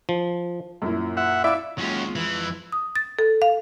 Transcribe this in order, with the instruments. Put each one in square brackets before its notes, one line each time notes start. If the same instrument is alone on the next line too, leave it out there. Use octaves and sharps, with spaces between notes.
[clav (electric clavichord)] F3
[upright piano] F#2 A#2 E4
[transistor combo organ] E5 F#5
[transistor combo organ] E4 D5 [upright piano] E5 F5 E6
[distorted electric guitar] D#2 [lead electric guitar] F#3 C#4 [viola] G#3 F4
[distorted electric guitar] F2 B5 [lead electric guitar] E3
[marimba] D#6
A6
A4
F5